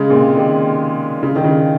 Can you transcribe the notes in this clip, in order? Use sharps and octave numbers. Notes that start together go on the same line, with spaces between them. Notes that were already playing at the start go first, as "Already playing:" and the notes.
Already playing: C#3 G#3
A#2
C3
D#3
C#3
D#3
C#3